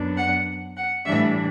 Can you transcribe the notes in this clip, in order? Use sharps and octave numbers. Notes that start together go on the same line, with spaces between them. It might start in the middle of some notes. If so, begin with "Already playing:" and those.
Already playing: F#2 F#3 B3 D4
F#5
F#5
A2 E3 G3 D4 E5